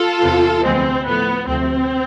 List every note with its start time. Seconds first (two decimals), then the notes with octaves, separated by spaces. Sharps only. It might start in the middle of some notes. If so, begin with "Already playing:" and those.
Already playing: F4 A4
0.22 E2 C3 E3 B3
0.63 D2 C3 F3 G#3 B3 C4
1.06 A2 F3 A3 B3
1.47 D2 C3 F3 A3 C4